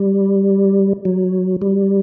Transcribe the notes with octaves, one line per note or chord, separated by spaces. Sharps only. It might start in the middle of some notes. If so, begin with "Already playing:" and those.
Already playing: G3
F#3
G3